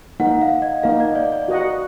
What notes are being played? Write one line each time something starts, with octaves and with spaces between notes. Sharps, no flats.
A#3 D#4 A#4 F#5
F5
D#5
A#3 D#4 A#4 F5
D#5
D5
D5
F#4 A#4 D#5 F#5